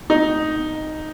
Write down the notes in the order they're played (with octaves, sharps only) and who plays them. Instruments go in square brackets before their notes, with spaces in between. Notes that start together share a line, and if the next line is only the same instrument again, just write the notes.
[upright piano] D#4